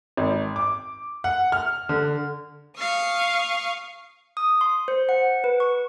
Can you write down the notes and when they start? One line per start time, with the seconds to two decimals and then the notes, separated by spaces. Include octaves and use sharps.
0.17 G#1
0.56 D6
1.24 F#5
1.52 F6
1.89 D3
2.76 F5 C#6 D#6
4.37 D#6
4.61 C6
4.88 C5
5.09 F#5
5.44 B4
5.60 C#6